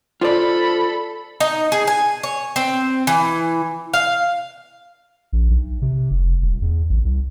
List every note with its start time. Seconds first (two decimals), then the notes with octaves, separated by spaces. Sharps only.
0.21 F4 A4 C5 D5 B5
1.41 D#4
1.72 G#4
1.87 G#5
2.23 C#5
2.56 C4
3.07 E3
3.94 F5
5.33 A#1
5.50 B1
5.82 C3
6.11 F1
6.42 D#1
6.62 E2
6.90 A1
7.05 C2